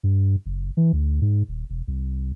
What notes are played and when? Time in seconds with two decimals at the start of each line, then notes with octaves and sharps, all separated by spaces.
0.03 G2
0.46 F#1
0.77 E3
0.93 D2
1.21 G#2
1.49 D#1
1.70 E1
1.88 C2